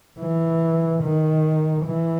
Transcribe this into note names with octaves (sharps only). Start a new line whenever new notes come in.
E3
D#3
E3